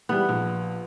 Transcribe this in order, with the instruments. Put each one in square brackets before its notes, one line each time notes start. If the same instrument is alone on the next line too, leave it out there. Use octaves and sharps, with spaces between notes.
[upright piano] E3 G3 G4 [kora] B3
[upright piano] A#1